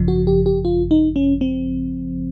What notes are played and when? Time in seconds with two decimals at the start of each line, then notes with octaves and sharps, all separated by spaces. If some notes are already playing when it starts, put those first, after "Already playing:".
Already playing: G#1 F#2 C#3 F3
0.08 F#4
0.27 G4
0.46 G4
0.65 F4
0.91 D#4
1.16 C#4
1.41 C4